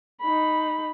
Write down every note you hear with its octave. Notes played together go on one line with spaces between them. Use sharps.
D#4 B5